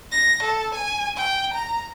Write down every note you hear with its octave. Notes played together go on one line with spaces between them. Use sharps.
A#6
A4
G#5
G5
A#5